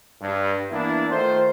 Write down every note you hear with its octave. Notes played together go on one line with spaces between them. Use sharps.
G2
E3 A#3 B3 D4 E4
D#3 A3 F4 C5